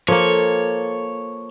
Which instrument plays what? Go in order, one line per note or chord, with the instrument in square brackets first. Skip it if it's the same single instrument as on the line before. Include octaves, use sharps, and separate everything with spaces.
[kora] F3 A#3 [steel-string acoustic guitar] A4 [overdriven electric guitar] C#5